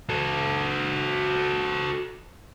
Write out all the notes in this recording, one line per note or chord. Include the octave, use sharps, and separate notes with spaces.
F#4 A4